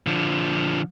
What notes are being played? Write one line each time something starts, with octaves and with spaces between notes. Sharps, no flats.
D3 F3